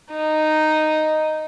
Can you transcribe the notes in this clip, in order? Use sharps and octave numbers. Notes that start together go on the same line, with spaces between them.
D#4